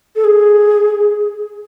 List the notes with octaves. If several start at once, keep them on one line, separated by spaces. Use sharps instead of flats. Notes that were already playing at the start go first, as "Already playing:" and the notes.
A4
G#4